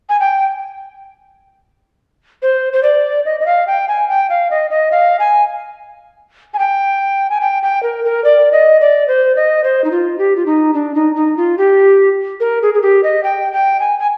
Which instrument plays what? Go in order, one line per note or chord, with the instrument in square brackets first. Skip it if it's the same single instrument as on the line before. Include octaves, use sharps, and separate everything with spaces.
[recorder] G#5
G5
C5
C5
D5
D#5
D#5
F5
G5
G#5
G5
F5
D#5
D#5
F5
G#5
G#5
G5
G#5
G5
G5
A#4
A#4
D5
D#5
D5
C5
D#5
C5
D#4
F4
G4
F4
D#4
D4
D#4
D#4
F4
G4
A#4
G#4
G#4
G4
D#5
G5
G5
G#5
G#5